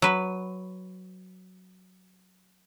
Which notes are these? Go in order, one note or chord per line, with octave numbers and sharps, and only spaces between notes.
F#3 B4